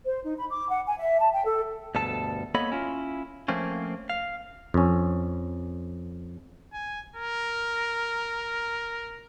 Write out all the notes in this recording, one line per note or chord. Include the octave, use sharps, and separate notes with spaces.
C5
D#4
B5
D6
F#5
G#5
E5
A5
G5
A4
D2 G2 B2 A4 A5
A#3 B3 A4 C#5 D#5 B5
C#4 E4 F4
F3 A3 A#3 C4 C#4
F5
F2 C#4
G#5
A#4